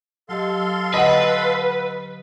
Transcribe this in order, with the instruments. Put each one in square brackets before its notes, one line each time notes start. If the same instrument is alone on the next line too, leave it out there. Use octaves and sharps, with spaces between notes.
[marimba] F#3 G4 D#5 [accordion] A4 F5 C6
[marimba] D3 [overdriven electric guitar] B4 [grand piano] D#5 F#5